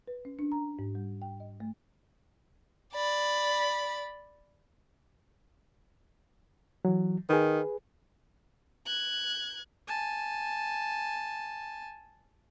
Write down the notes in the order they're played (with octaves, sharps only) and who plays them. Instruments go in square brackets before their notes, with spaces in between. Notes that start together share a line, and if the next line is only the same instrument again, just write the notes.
[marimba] B4
C#4
D4
A#5
G#2
G3
G5
D#5
A3
[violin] D5 B5
[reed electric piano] E3 F#3
[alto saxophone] D#3 [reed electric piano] G#4 B4
[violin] F#6 G#6
[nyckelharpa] G#5 A5